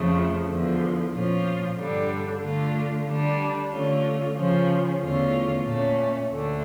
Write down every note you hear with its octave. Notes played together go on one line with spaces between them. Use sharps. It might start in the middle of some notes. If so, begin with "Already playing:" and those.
Already playing: F2 C#3 F3 A3
E2 D3 F3
A#2 F3 C#4 F4
G2 D3 G3 D4
D3 A3 D4 F4
D3 G3 D4
D3 A3 C#4 F4
C#3 F3 C#4
E2 D3 A3 C#4 F4
A#2 A3 C#4
D2 D3 A3